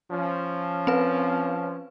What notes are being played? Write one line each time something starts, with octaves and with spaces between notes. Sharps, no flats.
F3 C#4
C4 B4